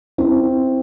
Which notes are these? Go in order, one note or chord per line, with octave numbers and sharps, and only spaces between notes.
C4 E4